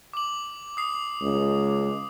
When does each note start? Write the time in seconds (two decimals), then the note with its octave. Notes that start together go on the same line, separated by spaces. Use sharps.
0.13 D6 F#7
0.77 D#6 C7
1.22 C#2